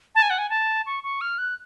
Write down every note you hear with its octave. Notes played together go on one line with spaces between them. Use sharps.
A5
G#5
F#5
G#5
A5
C#6
C#6
F6
F#6